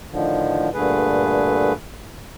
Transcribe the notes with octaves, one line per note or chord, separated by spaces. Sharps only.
A2 D3 D#3 F3
G2 A#2 D3 A3 G#4 B4